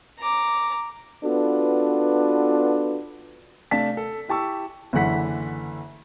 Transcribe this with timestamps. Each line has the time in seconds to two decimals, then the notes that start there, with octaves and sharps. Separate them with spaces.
0.19 A#5 D6
1.24 B3 D4 F4 F#4 A4 B4
3.71 C3 A3 D4 F5 A5 B6
3.97 A4
4.29 E4 G4 A5 C#6 E6
4.93 F#1 D3 E3 F#5 B6